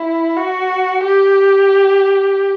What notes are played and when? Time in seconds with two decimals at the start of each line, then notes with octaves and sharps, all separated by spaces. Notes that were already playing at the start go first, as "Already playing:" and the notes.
Already playing: E4
0.36 F#4
1.04 G4